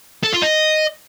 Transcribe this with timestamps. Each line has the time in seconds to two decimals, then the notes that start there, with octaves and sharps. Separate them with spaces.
0.24 A4
0.33 F4
0.42 D#5